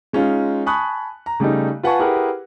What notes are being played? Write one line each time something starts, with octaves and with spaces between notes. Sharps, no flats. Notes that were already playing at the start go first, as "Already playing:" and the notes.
G#3 C#4 D#4 F4
G#5 A5 B5 C#6 D#6 F#6
A#5
C#3 G3 A3 D#4
F4 B4 F#5 G#5 A5 C#6
E4 G4 G#4 A#4 B4 F#5